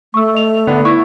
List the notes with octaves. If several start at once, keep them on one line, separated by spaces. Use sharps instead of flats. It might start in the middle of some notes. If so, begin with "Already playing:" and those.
A3 C#6 E6
D#5 F7
D3 B3 D4
E4 C#6